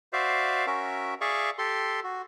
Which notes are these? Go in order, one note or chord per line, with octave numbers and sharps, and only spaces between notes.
F#4 C5 D5 E5 F5
C#4 F#4 A#4 E5
G#4 D5 E5 F5 C#6
G4 A4 C6
F#4